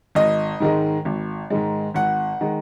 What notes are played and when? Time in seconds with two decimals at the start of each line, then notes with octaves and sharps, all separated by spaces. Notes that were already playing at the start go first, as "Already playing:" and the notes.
0.15 G#1 D#5
0.60 G#2 D#3 G#3
1.05 G#1
1.50 G#2 D#3 G#3
1.94 G#1 F#5
2.41 D#3 G#3